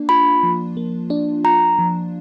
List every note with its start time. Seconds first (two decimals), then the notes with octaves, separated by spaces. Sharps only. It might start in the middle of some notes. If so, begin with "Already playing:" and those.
Already playing: A#3 D4
0.09 F4 B5
0.43 F3
0.77 A#3
1.10 D4
1.44 F4 A#5
1.79 F3